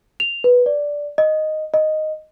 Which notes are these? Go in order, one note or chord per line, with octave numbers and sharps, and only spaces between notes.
F7
B4
D5
D#5
D#5